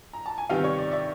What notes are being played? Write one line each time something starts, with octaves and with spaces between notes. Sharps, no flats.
A#5
A5
G#5
C3 D#3 G3 B3 F5 G5
C#5
D5
D5 E5